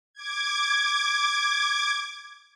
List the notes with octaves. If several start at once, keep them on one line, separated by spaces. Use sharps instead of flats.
D6 G#6